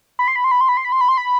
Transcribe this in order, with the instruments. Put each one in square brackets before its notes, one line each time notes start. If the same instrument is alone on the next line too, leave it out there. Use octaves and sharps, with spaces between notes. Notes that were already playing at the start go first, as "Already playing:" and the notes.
[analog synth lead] B5
C6
B5
C6
B5
C6
B5
C6
B5
C6
B5
C6
B5